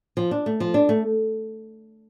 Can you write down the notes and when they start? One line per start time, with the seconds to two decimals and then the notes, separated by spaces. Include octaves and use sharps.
0.17 F3
0.31 D4
0.46 A3
0.60 F3
0.74 D4
0.89 A3